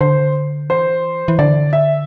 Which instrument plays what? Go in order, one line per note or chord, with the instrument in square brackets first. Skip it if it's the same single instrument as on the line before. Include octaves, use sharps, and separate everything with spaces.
[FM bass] D3 [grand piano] C5
[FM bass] E3 [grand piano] C5
[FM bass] E3
[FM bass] D3 [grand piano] D5
[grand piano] E5